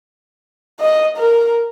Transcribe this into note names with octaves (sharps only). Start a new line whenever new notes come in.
D#5
A#4